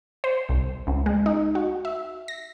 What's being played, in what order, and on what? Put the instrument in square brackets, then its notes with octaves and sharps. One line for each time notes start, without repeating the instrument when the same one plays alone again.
[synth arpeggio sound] C5
C2
C#2
G#3
D#4
F#4
E5
A#6